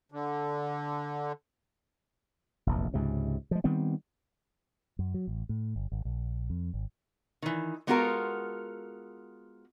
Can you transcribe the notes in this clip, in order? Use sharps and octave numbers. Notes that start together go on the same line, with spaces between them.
D3
F1 A#1 E2
C#2 G#2 C3
F3 G#3
D#3 G3 B3 C4
F#2
F#3
A1
A2
G1
G#1
A#1
F2
G#1
D#3 E3
G#3 B3 F4 F#4 A4 A#4